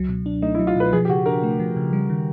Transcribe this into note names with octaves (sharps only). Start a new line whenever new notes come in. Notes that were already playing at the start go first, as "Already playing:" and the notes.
Already playing: C#2 F#3
B2
D4
A3 D#4
E4
F#3
F4
B2 B4
F3 G#4
G4
C#3 F#4
D4 A#4
A3
F3
C#3
G3
D#3